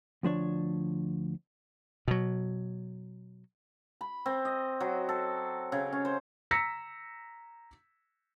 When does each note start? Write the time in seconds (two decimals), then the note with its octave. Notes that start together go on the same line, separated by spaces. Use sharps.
0.23 D2 F3 D4 C#5
2.08 B2 F#3
4.01 B5
4.26 C4
4.45 D#5
4.80 F#3
5.09 A4
5.72 C#3
5.93 C#4
6.05 C5
6.51 A#5 E6 A#6 B6 C#7